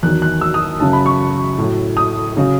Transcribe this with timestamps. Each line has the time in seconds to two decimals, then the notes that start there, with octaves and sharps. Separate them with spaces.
0.03 E2 D#3 F#3 F#6
0.22 F#6
0.41 E6
0.54 D#6
0.80 F#2 C#3 F#3 A5
0.93 B5
1.06 C#6
1.58 A2 F#3
1.97 D#6
2.36 C#3 F#3